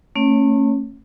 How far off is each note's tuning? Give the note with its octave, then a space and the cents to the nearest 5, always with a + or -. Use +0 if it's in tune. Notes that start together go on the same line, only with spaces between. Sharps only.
A3 +30 C#4 -20 C#5 +0